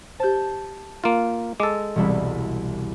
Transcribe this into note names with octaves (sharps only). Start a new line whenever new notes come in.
G4 C5 A5 G6
A#3 F4
G#3 A4 D6
E1 C2 E4